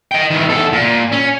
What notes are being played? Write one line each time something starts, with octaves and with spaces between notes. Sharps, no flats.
D#5 G5
D#3 E3
E2 A4
A#2
C#4